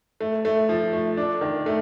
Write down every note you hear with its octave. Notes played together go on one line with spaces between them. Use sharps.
A3
A3
F3
A3
D4
D#3
A3